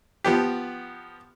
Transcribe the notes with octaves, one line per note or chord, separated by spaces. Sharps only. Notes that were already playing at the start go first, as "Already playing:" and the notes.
F3 B3 G4